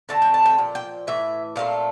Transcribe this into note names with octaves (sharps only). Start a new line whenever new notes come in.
D3 A3 C4 A5
G5
A5
G5
A#2 F3
G5
A2 E3 E5
A#2 A3 C4 F5